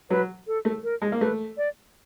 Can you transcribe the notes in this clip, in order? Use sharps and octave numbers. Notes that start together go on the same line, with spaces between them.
F#3 B4
A4
A3
A#4
G#3
A#3
A3 B4
D5